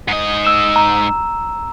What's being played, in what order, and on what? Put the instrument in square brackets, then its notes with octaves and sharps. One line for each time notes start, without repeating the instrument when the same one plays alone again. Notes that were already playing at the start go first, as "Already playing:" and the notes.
[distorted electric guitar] G#2 D#5
[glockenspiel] E6 E7
A#5